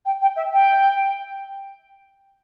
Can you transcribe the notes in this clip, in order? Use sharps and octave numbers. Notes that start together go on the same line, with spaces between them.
G5
G5
E5
G5